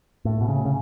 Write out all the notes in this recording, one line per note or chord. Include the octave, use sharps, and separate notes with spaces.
A2
B2
C#3
C#3